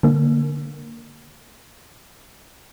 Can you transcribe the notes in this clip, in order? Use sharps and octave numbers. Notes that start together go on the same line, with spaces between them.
D3 A#3